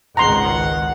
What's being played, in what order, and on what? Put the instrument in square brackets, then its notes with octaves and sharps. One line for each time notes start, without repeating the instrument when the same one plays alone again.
[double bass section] G#1 C#2 D#3 [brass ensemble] F#5 [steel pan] A#5 C6